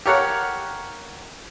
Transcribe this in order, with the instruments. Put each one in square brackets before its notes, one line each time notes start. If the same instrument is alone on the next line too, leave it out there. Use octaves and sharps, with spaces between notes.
[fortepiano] G4 A4 A#4 C#5 F5 F#5